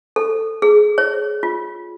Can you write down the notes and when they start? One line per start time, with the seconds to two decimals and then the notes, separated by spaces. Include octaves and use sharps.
0.16 A4
0.62 G#4
0.98 C#5
1.43 F4